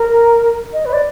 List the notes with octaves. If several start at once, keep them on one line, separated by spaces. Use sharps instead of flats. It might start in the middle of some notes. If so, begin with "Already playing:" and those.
Already playing: A#4
D#5
B4
D5